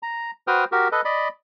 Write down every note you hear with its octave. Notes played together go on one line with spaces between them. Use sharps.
A#5
F#4 B4 C5 G5 D#6 F6
F#4 G4 A#4
A4 B4 D#5
D5 D#5 B5